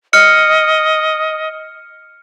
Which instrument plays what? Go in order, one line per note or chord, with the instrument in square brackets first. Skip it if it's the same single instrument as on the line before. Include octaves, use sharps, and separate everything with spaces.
[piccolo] D#5 [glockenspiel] F6 C#7